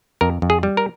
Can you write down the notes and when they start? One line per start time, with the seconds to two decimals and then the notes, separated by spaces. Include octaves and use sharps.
0.21 F2 A#4
0.42 F2
0.50 G#4
0.63 G3
0.77 A#4